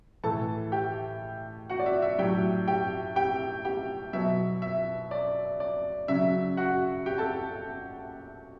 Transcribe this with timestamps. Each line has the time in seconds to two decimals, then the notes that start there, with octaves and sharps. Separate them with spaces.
0.24 A2 E3 A4 A5
0.72 G4 G5
1.70 F#4 F#5
1.79 D5
1.86 E5
2.02 E5
2.18 A2 F#3 G4 G5
2.67 G4 G5
3.16 G4 G5
3.65 G4 G5
4.13 B2 F#3 E5
4.62 E5
5.11 D5
5.60 D5
6.08 C#3 F#3 E5
6.57 F#4 F#5
7.06 G4 G5
7.18 A4 A5